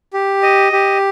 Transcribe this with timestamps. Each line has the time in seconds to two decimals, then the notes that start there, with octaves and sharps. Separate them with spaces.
0.13 G4
0.43 D#5
0.72 G4